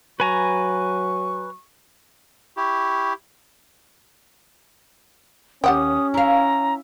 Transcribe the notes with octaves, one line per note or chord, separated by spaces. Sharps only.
F#3 B4 G#5 A#5 C#6
E4 G4 C#6
D#2 C#4 G4 F#5 G5 D#6
E4 F5 A#5